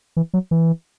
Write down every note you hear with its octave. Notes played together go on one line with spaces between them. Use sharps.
E3
F#3
E3